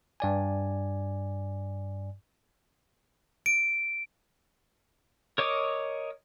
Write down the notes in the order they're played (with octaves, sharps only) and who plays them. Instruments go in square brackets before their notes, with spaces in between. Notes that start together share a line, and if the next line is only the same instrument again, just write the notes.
[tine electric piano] G2 D5 G#5
[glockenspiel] D7
[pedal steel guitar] A#4 C#5 D#5 D6